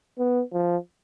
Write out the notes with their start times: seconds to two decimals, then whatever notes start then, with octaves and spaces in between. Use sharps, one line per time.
0.19 B3
0.53 F3